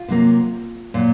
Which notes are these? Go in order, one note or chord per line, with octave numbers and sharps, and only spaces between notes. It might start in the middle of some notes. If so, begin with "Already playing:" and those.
Already playing: F4
C3 F#3 A#3
A#2 F#3